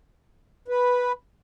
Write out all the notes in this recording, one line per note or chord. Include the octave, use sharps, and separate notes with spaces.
B4